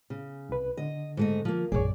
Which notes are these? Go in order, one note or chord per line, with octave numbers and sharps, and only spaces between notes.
C#3
C2 B4
D3 D#5
G#2 A3 D#5
F3 A#3
A#1 F#2 G#4 C#5 D5